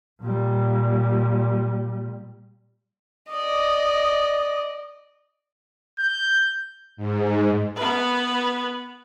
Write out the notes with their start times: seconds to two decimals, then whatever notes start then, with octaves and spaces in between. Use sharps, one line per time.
0.21 A#2 G3
3.30 D5 D#5
5.99 G6
6.97 G#2
7.76 B3 B4